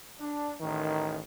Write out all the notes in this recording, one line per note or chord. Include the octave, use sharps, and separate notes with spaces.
D4
A1 D#3